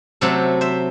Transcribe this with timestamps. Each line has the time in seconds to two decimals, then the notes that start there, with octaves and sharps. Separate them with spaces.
0.21 C3 F#3 A3 A4 C5
0.61 C5 E5